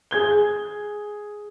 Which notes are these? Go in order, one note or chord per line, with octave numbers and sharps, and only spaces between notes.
G#4 G#6 G7